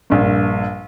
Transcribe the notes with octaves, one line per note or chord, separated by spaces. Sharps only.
A#1 G2